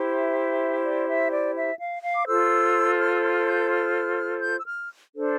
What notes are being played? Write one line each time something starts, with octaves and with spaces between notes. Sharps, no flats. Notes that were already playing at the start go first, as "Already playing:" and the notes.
Already playing: E4 G4 C5
E5
D5
E5
D5
E5
F5
F5
D6
F4 A4 C5 E6
F6
E6
F6
G6
F6
G6
E6
F6
D4 A4 C5